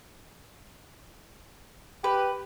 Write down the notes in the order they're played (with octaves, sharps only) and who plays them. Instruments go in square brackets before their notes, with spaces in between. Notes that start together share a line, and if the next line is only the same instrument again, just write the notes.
[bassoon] G4 [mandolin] B4